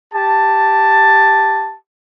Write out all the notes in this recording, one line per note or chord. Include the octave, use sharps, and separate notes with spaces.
G4 A5